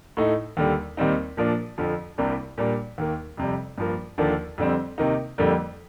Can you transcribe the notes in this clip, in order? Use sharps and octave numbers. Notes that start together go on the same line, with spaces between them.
A2 A3 D#4
D#2 D3 G3
D#2 D#3 G3 C4 D#4
A#2 F3 A#3 D4
F2 D3 F3
C2 C3 G3 A#3 D4
A#2 G3 A#3 D4
D#2 D#3 A#3
F2 C3 G3
G2 F3 A#3
D#2 D3 F3 A#3 D4
F2 D3 G3 C4
C3 D#3 A#3 D#4
F2 D3 G3 A#3